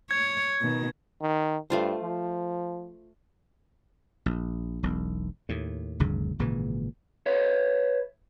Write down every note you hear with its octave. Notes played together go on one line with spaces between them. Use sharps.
C#5 G#6
B2 D#3
D#3
G2 A3 F4 C5
F3
A#1
E1 B1
D#2 A2
F1 D2 G2 C#3
G#1 A#2 C#3 E3
B4 C#5 E5